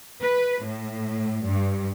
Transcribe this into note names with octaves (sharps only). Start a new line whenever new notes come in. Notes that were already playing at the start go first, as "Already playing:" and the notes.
B4
A2
G2